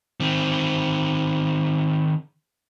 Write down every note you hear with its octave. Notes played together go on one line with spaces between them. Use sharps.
D#3 C4